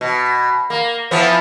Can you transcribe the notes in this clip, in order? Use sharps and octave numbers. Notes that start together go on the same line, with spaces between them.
B2
A#3
E3 F3 B3